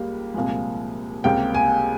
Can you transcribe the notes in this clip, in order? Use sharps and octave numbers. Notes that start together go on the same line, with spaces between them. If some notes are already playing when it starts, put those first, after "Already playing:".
Already playing: C#2 G3 A#3
C2 A#2 F3 G#3
C#2 C3 G3 A#3 G5
G#5